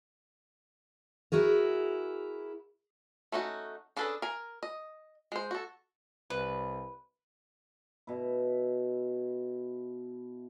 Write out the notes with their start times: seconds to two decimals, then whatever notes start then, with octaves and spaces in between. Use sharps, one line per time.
1.32 E4 F#4 G#4 A#4
3.32 A3 C#4 D#4 F#4
3.97 C#4 D4 G#4 A4 B4
4.22 A#4 G#5
4.63 D#5
5.32 G#3 C5
5.51 F#4 A4
6.30 C2 B4
8.07 B2 E4